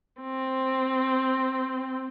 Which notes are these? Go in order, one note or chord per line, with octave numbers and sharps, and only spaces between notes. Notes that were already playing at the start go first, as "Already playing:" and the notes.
C4